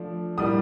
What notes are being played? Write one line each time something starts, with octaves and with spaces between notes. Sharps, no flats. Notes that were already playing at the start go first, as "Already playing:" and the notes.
Already playing: F3 A3 D4
A2 G3 A#3 D4 D#6